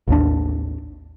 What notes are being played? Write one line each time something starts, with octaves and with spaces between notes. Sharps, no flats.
A1 D#2 D4